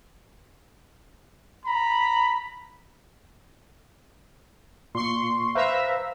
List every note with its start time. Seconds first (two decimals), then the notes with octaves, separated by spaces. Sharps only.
1.65 A#5 B5
4.95 A#2 C6 C#6
5.55 B4 C5 E5 F5 A#5